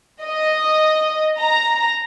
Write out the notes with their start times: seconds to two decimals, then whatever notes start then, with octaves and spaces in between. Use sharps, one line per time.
0.24 D#5
1.37 A#5